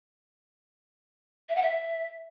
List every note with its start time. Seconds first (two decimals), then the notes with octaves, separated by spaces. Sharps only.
1.49 E5
1.56 F#5
1.62 E5